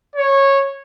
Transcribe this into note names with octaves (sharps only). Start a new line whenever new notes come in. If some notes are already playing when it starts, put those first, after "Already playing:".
C#5